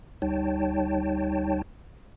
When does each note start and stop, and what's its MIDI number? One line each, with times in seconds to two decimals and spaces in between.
0.22 1.62 38
0.22 1.62 55
0.22 1.62 63
0.22 1.62 73
0.22 1.62 79
0.22 1.62 81